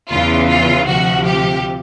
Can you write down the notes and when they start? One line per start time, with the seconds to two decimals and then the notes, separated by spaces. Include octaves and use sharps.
0.10 E2 C#3 E3 F4
0.49 F4
0.88 D2 C3 F3 F#4
1.26 G4